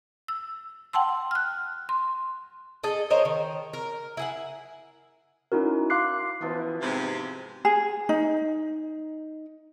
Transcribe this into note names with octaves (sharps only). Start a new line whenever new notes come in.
E6
F#5 G5 A5 C6 E6
F6 F#6
C6
G#4 A4 D#5
A#4 C5 C#5 D#5
D#3
A#4
E4 G#4 F#5
C#4 D#4 E4 F#4 A#4
F5 C6 D6 F#6 C7
B2 E3 F3 B3
G#2 C3 C4 C5 B5
G#4
D#4